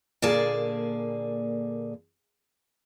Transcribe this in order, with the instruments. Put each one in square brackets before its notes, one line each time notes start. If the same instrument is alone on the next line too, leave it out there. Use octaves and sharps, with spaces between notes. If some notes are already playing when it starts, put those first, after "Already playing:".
[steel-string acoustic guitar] A#2 D3 A#3 G#4 D5 A5